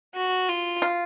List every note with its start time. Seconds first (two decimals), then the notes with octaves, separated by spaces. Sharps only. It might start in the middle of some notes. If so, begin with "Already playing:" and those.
0.15 F#4
0.48 F4
0.82 F4